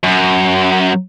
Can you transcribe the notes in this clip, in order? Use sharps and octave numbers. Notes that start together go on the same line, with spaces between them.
F#2